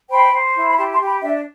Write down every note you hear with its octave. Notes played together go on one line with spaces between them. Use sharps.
C5 G5 B5
C5
E4
B5
G4 A5 C6
A5 C6
G4
G5 B5
D4 E5 G5